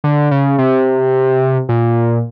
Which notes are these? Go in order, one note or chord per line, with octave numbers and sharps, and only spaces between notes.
D3
C#3
C3
A#2